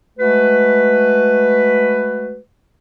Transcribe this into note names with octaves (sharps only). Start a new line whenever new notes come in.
G#3 A3 F#4 B4